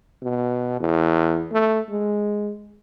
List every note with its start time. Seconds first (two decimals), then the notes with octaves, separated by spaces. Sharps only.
0.22 B2
0.80 E2
1.52 A3
1.90 G#3